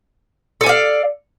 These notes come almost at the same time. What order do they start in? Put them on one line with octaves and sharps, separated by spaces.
A4 G#5 D5 F5